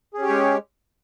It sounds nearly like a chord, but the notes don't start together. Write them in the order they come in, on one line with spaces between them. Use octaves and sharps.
G#4 C#4 G4 C#5 G#3